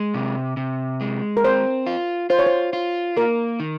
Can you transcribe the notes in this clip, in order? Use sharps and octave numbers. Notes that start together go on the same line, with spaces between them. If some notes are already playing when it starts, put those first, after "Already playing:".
Already playing: G#3
C3
C3
G#3
A#4
C4 C5
F4
F4 C5
C#5
C5
F4
A#3 A#4
D#3